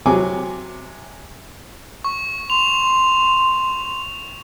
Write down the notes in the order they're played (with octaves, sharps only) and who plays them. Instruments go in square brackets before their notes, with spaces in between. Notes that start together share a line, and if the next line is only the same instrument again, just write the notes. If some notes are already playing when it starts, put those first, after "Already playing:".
[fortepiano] C3 F#3 G#5 D6
[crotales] C#6
[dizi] C6 [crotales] F7